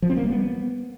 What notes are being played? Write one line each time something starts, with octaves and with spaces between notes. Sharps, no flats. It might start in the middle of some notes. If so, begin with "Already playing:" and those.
F3
C4
A#3
G3
B3